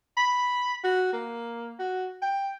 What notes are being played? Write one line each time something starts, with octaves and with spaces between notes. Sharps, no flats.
B5
F#4
A#3
F#4
G5